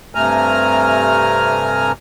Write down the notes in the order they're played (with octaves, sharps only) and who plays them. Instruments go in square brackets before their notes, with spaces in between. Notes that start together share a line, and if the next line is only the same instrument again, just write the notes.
[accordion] G2 C3 A3 G#5 A#5 F6